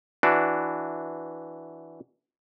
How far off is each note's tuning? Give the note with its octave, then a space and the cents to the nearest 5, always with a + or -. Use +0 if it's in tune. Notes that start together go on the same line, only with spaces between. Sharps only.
E3 +0 D4 +0 F#4 +5